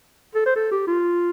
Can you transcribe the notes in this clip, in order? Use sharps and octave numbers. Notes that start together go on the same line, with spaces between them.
A4
C5
A4
G4
F4